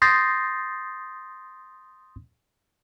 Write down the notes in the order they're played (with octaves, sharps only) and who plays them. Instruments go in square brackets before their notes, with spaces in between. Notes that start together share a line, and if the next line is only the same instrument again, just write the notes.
[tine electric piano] C6 D#6 G6 A6 A#6 C7